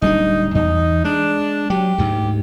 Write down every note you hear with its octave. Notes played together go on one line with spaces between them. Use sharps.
D1 G3 D4 D#4
E2 D#4
G#3 D4
F#3 G4
D2 G#2